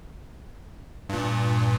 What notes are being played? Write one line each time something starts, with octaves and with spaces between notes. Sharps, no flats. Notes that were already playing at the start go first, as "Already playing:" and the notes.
G2 A#2